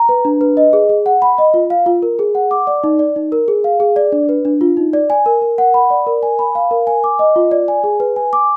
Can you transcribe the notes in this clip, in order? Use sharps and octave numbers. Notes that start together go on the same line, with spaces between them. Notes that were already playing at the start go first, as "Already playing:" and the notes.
Already playing: A#5
B4
D4
B4
D#5
G#4
G#4
F#5
B5
D#5
F4
F5
F4
A#4
G#4
F#5
D6
D5
D#4
D5
D#4
A#4
G#4
F5
G#4
D5
D4
B4
D4
F4
D#4
D5
G#5
A#4
A#4
F#5
B5
D5
A#4
G#5
B5
F5
A#4
G#5
D6
D#5
F4
D5
G#5
G#4
B4
G#5
D6